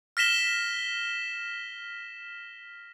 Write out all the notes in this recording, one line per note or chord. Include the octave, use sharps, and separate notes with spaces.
F6 A#6 B6 E7 G7